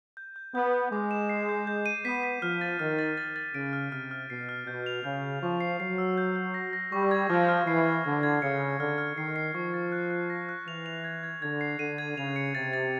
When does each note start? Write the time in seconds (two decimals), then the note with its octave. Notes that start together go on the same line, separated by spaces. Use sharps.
0.17 G6
0.36 G6
0.55 B3 G6
0.73 G6
0.92 G#3 D6
1.11 E7
1.29 C7
1.49 G6
1.67 G6
1.86 D#7
2.05 B3 B6
2.23 B6
2.42 F3 F6
2.61 A6
2.79 D#3 F6
2.99 A6
3.17 A6
3.36 A6
3.54 C#3 D7
3.73 F6
3.92 C3 F6
4.11 F6
4.30 B2 C7
4.49 F6
4.67 B2 G6
4.86 F7
5.04 C#3 G6
5.23 G6
5.43 F3 C#6
5.61 C7
5.80 F#3 C7
5.98 E6
6.18 G6
6.36 G6
6.54 A#6
6.73 A#6
6.92 G3 C#6
7.11 G#6
7.30 F3 F6
7.49 F6
7.67 E3 C7
7.86 G#6
8.05 D3 G#6
8.23 G#6
8.42 C#3 C#7
8.61 F6
8.79 D3 F6
8.98 F6
9.17 D#3 C7
9.36 C7
9.55 F3 C#6
9.74 A6
9.92 F#6
10.11 F#6
10.30 A#6
10.49 F#6
10.67 E3 F7
10.86 F7
11.04 G#6
11.23 G#6
11.42 D3 G#6
11.61 C7
11.79 D3 D#7
11.98 G#6
12.17 C#3 F7
12.36 C#7
12.55 C3 A6
12.73 A6